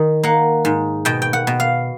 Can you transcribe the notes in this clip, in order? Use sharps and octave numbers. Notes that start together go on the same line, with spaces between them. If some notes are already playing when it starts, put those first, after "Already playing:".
Already playing: D#3
A#3 F#5
G#2
B2 G5
G5
F#5
B2
F5